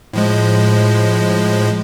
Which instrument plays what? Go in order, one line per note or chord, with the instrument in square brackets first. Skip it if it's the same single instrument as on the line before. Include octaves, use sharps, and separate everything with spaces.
[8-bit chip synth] A2 F3 G#3